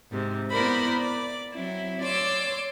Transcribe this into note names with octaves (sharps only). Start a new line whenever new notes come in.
G#2 C3
B3 E4 A#4 C5 D5 B5
D5
F#3 C4 E4
C#5 D5 C6 D6 E6